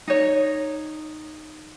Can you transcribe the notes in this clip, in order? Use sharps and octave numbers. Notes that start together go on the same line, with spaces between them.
D#4 C#5